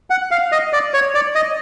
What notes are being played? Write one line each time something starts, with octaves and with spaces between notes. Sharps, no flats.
F#5
F5
D#5
D5
C#5
D5
D#5